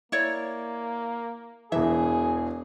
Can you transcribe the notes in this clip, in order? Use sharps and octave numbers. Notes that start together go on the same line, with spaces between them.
A#3 E4 C#5 D5
E1 E3 G#4 E5